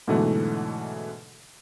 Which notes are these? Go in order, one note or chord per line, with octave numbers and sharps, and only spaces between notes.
G#2 B2 D3 E3 F#3 A3